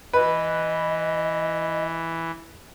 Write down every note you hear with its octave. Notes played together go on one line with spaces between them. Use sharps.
E3 B4 D#5